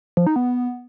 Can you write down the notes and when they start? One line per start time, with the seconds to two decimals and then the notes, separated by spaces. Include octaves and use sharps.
0.17 F3
0.26 D#4
0.36 B3